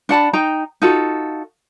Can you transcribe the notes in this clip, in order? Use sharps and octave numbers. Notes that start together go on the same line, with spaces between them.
D4 F#5 A5 B5
D#4 G5 A#5
D#4 F4 F#4 A4